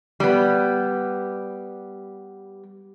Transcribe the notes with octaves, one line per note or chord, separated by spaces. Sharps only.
G3 B3